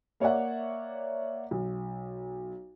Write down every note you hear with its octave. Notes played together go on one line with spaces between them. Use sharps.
A#3 C#5 D5 E5 F#5
B1